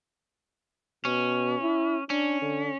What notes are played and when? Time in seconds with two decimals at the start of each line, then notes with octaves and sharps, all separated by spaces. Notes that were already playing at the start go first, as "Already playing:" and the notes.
1.05 B2 C#4
1.62 E4
2.10 C#4 D4
2.42 D3